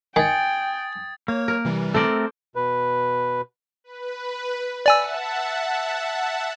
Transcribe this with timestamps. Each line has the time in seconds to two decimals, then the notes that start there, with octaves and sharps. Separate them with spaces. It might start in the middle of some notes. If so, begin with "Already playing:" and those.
0.16 D#3 G5 G#5 D#6 G#6 A6
1.28 A#3 C#5
1.48 A#4
1.65 C3 E3 G3
1.94 A3 C4 A4 A#4 C5 D5
2.56 B2 B4
3.84 B4
4.86 D5 E5 F#5 G#5 A5 E6